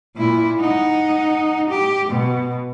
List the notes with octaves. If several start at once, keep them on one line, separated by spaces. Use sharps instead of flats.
A#2 E4
D#4 F#5
G4
B2